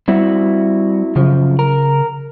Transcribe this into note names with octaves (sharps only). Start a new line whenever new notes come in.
G3 C4 E4 F#4
F#2 C#3 F3
A#4